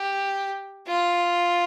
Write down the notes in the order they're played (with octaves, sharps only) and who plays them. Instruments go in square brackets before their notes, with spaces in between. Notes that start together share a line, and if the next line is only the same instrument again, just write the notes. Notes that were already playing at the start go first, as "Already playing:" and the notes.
Already playing: [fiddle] G4
F4